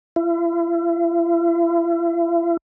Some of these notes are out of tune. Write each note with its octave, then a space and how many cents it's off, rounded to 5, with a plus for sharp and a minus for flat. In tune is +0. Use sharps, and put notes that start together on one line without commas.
E4 +45